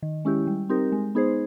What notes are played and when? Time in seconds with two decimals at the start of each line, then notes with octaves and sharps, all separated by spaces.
0.03 D#3
0.25 G#3 C#4 E4 G4
0.47 G3
0.69 C4 D#4 G4 A#4
0.92 G#3
1.15 B3 D#4 G#4 C5